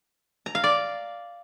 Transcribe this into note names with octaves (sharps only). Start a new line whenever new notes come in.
A#5
F5
D5